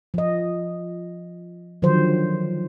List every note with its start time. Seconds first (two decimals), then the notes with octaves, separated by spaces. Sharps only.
0.14 F3 D#5
1.82 D3 D#3 F3 F#3 C5